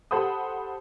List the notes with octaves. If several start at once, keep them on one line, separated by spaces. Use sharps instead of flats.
G4 A4 C5 F#5 B5 D#6